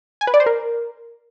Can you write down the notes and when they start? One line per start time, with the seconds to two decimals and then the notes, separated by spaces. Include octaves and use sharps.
0.21 G#5
0.27 B4
0.34 D5
0.40 C5
0.46 A#4